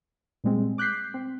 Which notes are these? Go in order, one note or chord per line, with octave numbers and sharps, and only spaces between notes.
A#2 G3 G#3 C4
D6 F#6 G6 B6 C7
C4